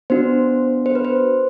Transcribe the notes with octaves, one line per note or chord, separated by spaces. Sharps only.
B3 D4 F#4 C5
C5
B4
C5